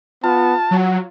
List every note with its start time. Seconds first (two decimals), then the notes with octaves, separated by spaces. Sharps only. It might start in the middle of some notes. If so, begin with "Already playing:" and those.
0.24 B3 F4 A5
0.71 F#3 F#5